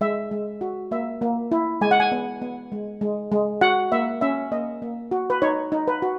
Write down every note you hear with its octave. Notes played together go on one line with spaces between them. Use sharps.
G#3 E5
G#3
F#4
A#3 E5
A#3
E4
G#3 G#5
F#5
G#5
B3
B3
G#3
G#3
G#3
F#4 F#5
A#3 E5
C#4 E5
A#3 D#5
A#3
F#4
B4
D#4 C#5
D#4
B4
F#4